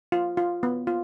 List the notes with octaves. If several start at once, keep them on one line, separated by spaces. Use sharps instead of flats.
F4
F4
B3
F4